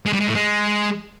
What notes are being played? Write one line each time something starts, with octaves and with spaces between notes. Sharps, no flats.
G#3
G3
G#3
A2
G#3